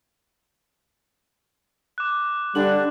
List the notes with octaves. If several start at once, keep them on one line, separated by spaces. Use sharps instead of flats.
D6 F#6
D3 G3 D4 F#7